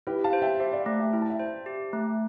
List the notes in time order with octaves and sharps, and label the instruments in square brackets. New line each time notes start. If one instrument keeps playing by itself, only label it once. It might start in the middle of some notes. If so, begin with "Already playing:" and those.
[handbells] E4 [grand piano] G4 B4
[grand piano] F5 A5
[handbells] C5
[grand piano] E5 G5
[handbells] G4 [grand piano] C5 E5
[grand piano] D5 F5
[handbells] A3
[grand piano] E5 G5
[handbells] E4 [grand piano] G5
[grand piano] A5
E5 G5
[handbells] C5
G4
A3